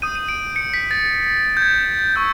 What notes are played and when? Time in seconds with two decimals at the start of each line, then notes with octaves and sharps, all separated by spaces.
0.02 D#6 G6 D#7
0.15 D#7
0.29 D7
0.56 C#7
0.74 B6
0.91 A6
1.57 G6
1.62 G#6
2.16 C#6 E6 G6